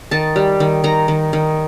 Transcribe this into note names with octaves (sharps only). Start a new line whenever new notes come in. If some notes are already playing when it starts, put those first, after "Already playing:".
D#3 A5
G3
D#3
D#3 A#5
D#3
D#3